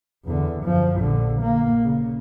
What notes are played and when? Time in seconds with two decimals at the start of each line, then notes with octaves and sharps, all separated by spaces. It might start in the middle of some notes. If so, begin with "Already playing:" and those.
0.24 E2 D3
0.64 F#2 F3
0.98 A#1 D3
1.42 A#3
1.84 C#3